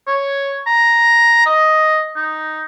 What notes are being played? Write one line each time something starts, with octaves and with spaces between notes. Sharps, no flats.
C#5
A#5
D#5
D#4